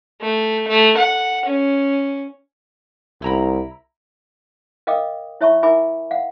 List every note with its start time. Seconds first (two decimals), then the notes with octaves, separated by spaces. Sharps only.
0.21 A3
0.68 A3
0.97 F#5
1.45 C#4
3.22 C2 E4 A#5 B5
4.87 A#4 D#5 F5 G5 D6 D#6
5.41 E4 C#5 E5 A5 B5 C#6
5.63 E4 A#4 E5 G#5 B5 D6
6.11 F5 F#5